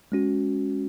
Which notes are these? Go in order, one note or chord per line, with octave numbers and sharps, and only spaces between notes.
G#3 C#4 F#4